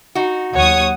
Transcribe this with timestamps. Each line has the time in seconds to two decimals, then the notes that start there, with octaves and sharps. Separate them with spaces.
0.15 D#4 F#4
0.54 D#2 F#3 C#5 F#5 C#6 D#6